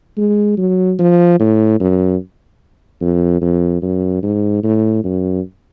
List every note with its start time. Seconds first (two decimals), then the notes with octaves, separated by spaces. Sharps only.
0.18 G#3
0.58 F#3
0.99 F3
1.40 A2
1.80 F#2
3.02 F2
3.42 F2
3.82 F#2
4.23 G#2
4.64 A2
5.04 F#2